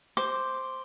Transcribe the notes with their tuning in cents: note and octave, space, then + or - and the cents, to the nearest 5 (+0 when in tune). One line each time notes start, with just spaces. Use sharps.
C5 +0 D6 +0